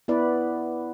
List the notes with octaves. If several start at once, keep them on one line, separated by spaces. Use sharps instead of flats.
B3 E4 B4 D5